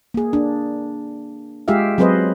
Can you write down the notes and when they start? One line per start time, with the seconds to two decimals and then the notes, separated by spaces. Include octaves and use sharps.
0.14 A#3 G#4
0.33 D4
1.68 G#3 F4 G4 G#4 E5 F5
1.98 F#3 C4 G#4 B4 C5 D#5